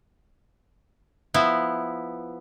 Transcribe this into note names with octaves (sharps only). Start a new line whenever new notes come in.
F3 B3 E4